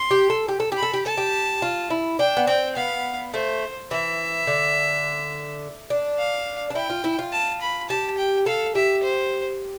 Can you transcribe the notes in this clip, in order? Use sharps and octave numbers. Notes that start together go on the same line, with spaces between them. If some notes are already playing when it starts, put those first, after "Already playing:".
Already playing: C6
G4
A4
G4
A4
G4
B5
A4
G4
A4 A5
G4
F4
E4
D4 G5
B3
C4 G5
B3 F5
A3 C5
E3 E5
D3
D4
F5
D4
E4 G5
F4
E4
F4
A5
B5
G4 A5
G5
A4 F5
G4 E5
C5